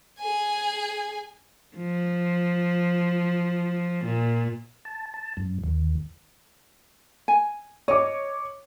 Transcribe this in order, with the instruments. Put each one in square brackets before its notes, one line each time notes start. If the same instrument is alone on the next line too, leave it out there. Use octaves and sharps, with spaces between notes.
[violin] G#4 G#5
[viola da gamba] F3
A#2
[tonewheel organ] A5
A5
F#2
D#2
[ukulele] G#5
[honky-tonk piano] C#5 D6 [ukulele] D#5